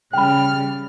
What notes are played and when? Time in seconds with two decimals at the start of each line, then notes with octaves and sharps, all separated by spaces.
0.13 C#3 G3 G5 B5 F6